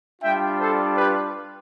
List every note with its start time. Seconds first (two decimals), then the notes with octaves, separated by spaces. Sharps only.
0.22 G3 D4 F4 E5 G5
0.59 A4 C5
0.97 G4 B4